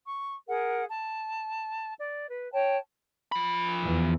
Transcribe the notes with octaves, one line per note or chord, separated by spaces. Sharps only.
C#6
G#4 A#4 F#5
A5
D5
B4
C#5 G5 A5
F3 B5
E2 E3